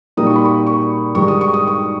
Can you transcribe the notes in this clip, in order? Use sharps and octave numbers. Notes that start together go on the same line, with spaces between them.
A#2 G3 A#3 D#4 D#6
C#6
B5
C#6
C#6
G2 D#3 G#3 D#4 C#6
D#6
C#6
D#6
C#6